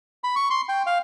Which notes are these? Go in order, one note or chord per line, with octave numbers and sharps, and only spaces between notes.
B5
C#6
C6
G5
F5